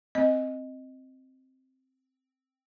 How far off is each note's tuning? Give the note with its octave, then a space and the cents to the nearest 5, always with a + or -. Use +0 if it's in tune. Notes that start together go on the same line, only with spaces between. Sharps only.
C4 +0 D#5 +0